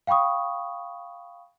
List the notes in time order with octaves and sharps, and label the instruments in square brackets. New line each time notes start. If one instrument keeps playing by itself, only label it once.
[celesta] F5 G5 B5 C#6 D#6